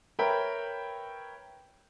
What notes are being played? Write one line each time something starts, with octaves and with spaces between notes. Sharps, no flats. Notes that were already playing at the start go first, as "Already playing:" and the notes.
A#4 B4 C#5 E5 G5 B5